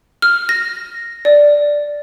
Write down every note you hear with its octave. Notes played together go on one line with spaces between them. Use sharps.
F6
A#6
D5